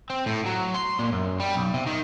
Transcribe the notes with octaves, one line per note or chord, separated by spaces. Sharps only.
C4
A2
F#3
C6
A#2
F#2
G3
B1
C3
D#3